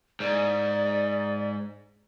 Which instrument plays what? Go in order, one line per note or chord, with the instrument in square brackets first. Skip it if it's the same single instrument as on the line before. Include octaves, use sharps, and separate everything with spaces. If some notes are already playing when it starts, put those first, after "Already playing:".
[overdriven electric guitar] G#2 [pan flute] D5